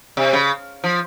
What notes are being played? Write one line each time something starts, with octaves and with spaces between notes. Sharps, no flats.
C3
C#3
F3